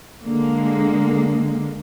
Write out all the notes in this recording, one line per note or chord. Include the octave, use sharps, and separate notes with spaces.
D3 G#3 A#3